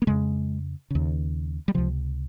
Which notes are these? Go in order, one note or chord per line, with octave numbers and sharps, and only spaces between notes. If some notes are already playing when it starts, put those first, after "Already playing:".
A#3
F2 C#3 G#3
D#2 C#3
G3
C#2 C3 F3